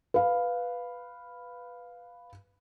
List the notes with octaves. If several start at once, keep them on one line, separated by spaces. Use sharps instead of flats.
B4 F5